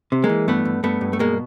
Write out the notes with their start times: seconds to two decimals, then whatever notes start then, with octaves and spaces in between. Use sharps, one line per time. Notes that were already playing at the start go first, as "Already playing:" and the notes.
0.12 C3
0.24 G#3 A#3
0.29 E3
0.48 G2 A3 B3
0.65 G2
0.84 G2 A3 B3
1.01 G2
1.13 A3
1.19 B2 G#3 A#3